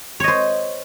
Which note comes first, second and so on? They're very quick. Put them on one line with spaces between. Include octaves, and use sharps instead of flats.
C#5 D#5 C5